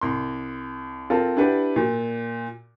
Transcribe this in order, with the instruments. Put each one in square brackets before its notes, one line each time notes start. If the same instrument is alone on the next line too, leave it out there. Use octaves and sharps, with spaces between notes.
[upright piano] C2 C6
C4 F4 A4 A#4
D4 E4 G4 B4 F#5 B5
A#2